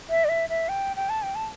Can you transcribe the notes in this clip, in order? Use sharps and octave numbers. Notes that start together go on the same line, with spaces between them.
E5
D5
E5
E5
G5
G5
A5
G5
A5